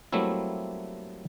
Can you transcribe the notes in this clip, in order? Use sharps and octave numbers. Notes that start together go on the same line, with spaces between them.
F#3 G3 A3 A#3 C4 E4